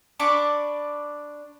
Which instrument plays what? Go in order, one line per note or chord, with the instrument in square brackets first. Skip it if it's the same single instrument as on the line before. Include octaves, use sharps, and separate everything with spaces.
[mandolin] D4 B5 C#6 D6